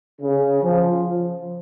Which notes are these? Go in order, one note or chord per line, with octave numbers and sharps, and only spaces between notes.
C#3
F3